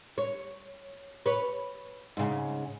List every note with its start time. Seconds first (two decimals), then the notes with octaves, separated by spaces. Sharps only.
0.18 C#5
1.26 B4 C#5
2.17 G#2 C#3